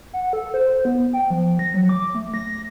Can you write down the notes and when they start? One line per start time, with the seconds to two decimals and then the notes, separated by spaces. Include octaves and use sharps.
0.13 F#5
0.33 A4
0.54 C5
0.85 B3
1.13 G5
1.30 F3
1.59 A#6
1.74 F#3
1.89 D6
2.15 A3
2.34 A#6